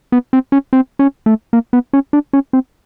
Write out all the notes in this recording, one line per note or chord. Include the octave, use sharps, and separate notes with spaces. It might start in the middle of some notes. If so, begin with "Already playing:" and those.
B3
C4
C#4
C4
C#4
A3
A#3
B3
C#4
D4
C#4
C4